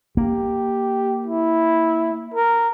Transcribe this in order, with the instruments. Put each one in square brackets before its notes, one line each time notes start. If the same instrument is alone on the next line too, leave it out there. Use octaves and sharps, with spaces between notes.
[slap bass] A#3 [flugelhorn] G4
[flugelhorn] E4
A#4